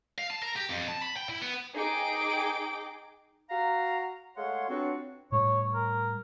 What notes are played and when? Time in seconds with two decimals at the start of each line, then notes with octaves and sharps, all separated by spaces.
0.18 F5
0.30 A5
0.42 A#4
0.56 G4
0.69 F2
0.88 A5
1.02 B5
1.16 G5
1.29 E4
1.42 B3
1.75 D#4 G#4 G5 D6 D7
3.50 F#4 F5 A#5
4.36 G#3 A3 C#5 F5 F#5 C6
4.69 F#3 B3 C4 D4 F4 F#4
5.32 A2 G3 C#5
5.74 A#4